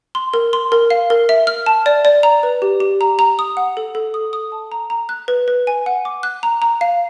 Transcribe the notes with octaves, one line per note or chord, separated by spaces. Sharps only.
C6
A#4
C6
A#4
F5
A#4
E5
F6
A5
D5
D5
A#5
B4
G4
G4
A#5
A#5
D#6
F#5
A4
A4
D#6
D#6
A5
A#5
A#5
F#6
B4
B4
G#5
F#5
D6
F#6
A#5
A#5
F5